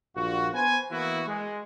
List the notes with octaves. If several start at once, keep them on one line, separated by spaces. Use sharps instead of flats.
A#1 G2 F4 F#4
B3 B4 C5 G#5
E3 A#3 B3 E4 F#4
G#3